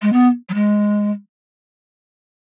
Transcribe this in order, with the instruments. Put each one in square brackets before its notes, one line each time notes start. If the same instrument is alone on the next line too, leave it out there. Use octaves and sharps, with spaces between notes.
[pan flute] G#3
B3
F#3
G#3